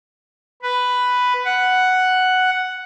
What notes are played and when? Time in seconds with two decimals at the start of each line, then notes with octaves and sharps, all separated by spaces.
0.62 B4
1.45 F#5